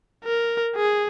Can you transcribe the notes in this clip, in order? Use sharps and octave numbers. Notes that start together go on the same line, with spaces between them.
A#4
G#4